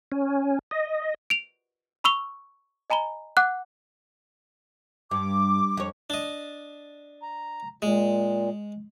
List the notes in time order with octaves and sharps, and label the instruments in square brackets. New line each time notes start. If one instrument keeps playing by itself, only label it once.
[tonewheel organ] C#4
D#5
[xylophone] D7 F7
B5 C#6 E6 F7 G7
D#5 G#5 A#5 B5 G7
F#5 D6 F#6
[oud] G2 [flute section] D6
[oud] F2 C#5
[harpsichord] D4 D#5
[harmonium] A#5
[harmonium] A#2 [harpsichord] G#3